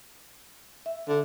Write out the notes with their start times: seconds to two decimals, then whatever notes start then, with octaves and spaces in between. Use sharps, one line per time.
0.86 E5
1.07 D3